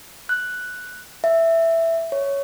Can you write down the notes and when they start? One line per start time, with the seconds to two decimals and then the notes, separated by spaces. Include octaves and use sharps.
0.29 F#6
1.24 E5
2.12 C#5